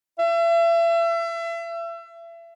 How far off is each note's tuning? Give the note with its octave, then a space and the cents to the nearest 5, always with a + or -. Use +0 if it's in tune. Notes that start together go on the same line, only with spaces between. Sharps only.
E5 +35